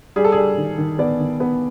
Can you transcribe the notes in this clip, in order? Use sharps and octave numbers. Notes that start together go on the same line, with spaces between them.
G3 G#4
A4
G3 G#4
D#3
D#3
B3 D5
D#3
B3